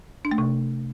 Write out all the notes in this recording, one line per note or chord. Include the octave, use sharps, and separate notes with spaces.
D4
A3
C3